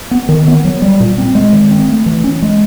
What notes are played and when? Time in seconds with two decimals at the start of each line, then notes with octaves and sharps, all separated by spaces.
0.11 B3
0.29 D#3
0.48 B3
0.65 F#3
0.82 G3
1.00 A#2
1.18 C4
1.35 G#3
1.53 D#3
1.71 C4
1.88 A3
2.06 E3
2.24 C#4
2.42 G#3